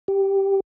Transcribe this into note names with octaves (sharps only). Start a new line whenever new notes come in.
G4